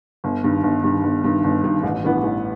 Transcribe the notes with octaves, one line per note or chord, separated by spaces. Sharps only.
G1
G2 D#3
G1
G2 D#3
G1
G2 D#3
G1
G2 D#3
A1
G2 E3 B3
A1